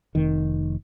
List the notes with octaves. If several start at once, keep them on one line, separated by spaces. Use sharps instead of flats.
F1 D#3